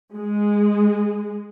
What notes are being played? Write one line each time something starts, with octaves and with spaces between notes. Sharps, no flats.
G#3